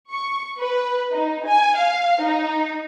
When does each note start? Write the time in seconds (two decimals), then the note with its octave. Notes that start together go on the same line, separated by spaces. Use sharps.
0.11 C#6
0.59 B4
1.12 D#4
1.45 G#5
1.78 F5
2.22 D#4